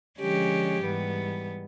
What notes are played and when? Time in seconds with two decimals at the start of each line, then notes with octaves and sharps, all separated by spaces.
0.19 D3 F3 G#3 C#4 G4
0.83 G#2 E3 G3 B3